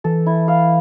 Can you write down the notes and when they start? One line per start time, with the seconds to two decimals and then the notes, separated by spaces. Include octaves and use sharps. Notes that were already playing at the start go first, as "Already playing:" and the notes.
0.04 E3 A4
0.26 E4
0.48 F5